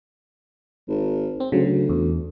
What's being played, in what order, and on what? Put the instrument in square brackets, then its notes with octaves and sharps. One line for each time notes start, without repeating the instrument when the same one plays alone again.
[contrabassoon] G#1
[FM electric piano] C4
[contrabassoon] D2 [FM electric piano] C#3 F#3
[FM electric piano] E2